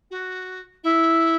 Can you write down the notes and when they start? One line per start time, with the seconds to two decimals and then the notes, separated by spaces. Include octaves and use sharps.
0.10 F#4
0.83 E4